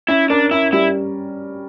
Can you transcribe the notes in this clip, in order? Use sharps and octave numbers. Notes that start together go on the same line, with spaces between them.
C#4 E4
D4 A#4
C#4 E4
G3 E4